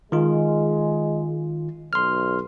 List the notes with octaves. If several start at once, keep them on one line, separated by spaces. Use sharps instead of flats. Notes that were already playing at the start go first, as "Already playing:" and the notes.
D#3 G#3 F4
B1 C6 F6